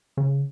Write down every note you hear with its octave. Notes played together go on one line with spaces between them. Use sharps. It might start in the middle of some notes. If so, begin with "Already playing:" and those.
C#3